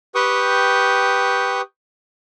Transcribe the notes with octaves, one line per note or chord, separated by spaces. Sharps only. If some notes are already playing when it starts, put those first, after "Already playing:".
G4 B4 G5 C#6 D#6